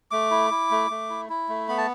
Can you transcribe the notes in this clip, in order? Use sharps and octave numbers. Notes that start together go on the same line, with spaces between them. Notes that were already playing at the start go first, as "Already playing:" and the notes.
A3 D6
E4
E4
A3
A3
E4
E4
A3
B3 B5
A5